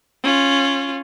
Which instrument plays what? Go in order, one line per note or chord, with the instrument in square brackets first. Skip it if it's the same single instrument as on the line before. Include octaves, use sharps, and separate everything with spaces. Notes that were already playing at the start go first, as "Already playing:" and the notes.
[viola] C#4 F4